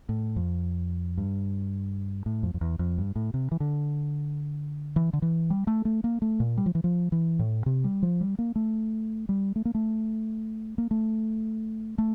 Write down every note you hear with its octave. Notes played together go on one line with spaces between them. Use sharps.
A2
F2
G2
A2
F2
F2
E2
F2
G2
A2
C3
E3
D3
E3
D3
E3
G3
A3
A3
A#3
A3
A#2
G3
F3
E3
F3
E3
A2
C3
G3
F3
G3
A#3
A3
G3
A3
A#3
A3
A#3
A3
A3